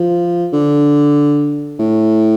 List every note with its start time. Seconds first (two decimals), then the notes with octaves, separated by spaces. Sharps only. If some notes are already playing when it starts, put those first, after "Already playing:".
Already playing: F3
0.53 D3
1.79 A2